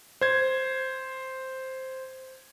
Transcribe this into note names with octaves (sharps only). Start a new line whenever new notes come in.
C5 G#6